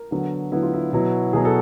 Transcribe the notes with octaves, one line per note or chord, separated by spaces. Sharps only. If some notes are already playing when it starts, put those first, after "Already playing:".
Already playing: A#4
D3 F#3 B3
D3 F#3 B3 E4
F4
E4
B2 F#3 B3 E4
B2 F#3 B3 G#4
A4